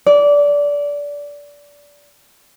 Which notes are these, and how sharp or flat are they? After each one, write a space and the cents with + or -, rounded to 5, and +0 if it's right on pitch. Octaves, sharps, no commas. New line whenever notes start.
D5 -20